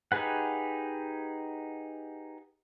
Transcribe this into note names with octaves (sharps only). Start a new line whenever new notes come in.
D#4 G4 G#4 B4 F#5